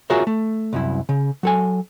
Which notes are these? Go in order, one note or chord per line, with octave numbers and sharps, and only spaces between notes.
F4 F#4 G#4 A#4 C#5 E5
A3
C2 F#2 E4
C#3
F#3 A4 G#5